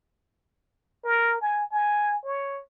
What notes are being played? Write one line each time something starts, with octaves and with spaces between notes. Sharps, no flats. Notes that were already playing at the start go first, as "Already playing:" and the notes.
A#4
G#5
G#5
C#5